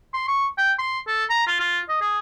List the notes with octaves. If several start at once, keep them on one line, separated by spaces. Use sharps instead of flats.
C6
C#6
G5
C6
A4
A#5
F4
F4
D#5
G#4